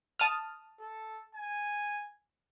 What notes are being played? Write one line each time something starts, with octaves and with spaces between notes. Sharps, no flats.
A5 D#6 F6
A4
G#5